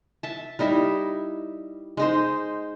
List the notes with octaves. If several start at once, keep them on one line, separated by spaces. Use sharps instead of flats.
E5 A5
G3 D#4 E4 E5
G#3 D#4 C5